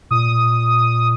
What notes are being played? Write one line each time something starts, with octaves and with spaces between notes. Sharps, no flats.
A#2 D#6